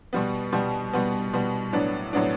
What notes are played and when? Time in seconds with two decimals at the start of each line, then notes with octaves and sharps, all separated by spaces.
0.13 B2 G3 B3
0.52 B2 G3 B3
0.93 B2 G3 B3
1.33 B2 G3 B3
1.72 A2 F#3 B3 D4
2.13 A2 F#3 B3 D4